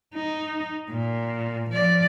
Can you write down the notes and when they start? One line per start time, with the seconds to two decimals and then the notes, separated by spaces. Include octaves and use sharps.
0.14 D#4
0.90 A#2
1.70 F3 D5